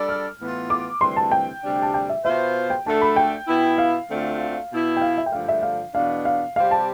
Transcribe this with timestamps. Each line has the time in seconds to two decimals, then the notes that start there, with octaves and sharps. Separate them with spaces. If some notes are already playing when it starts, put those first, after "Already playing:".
Already playing: G3 D4 A4 D5
0.09 F6
0.39 A2 E3 B3 F4
0.70 D6
1.01 D2 C3 E3 G3 C4 C6
1.16 A5
1.32 G5
1.63 D2 C3 G3 D4
1.82 A5
1.94 G5
2.09 E5
2.24 B2 B3 F4 C5 E5
2.70 G5
2.85 D2 D3 A3 D4 A4 A5
3.01 B5
3.16 G5
3.47 B2 B3 E4
3.78 F5
4.09 D2 D3 A3 C4 F4
4.71 B2 B3 E4
4.97 G5
5.01 F5
5.18 E5
5.26 G5
5.32 G2 D3 F3 A3 D4 F5
5.48 E5
5.63 F5
5.94 E2 B2 B3 D4 F5
6.25 F5
6.55 C3 G3 C4 G4 C5 F5
6.71 A5